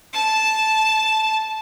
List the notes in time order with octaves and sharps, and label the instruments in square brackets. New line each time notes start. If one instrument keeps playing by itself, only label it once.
[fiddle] A5